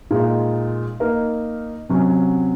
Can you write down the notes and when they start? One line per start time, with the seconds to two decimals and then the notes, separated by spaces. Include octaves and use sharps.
0.11 A#2 G#3 D#4
1.00 A#3 D#4 A#4
1.89 C3 F#3 C#4